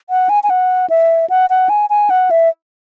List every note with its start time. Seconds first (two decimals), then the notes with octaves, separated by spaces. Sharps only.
0.10 F#5
0.29 G#5
0.44 G#5
0.50 F#5
0.90 E5
1.30 F#5
1.50 F#5
1.69 G#5
1.90 G#5
2.10 F#5
2.31 E5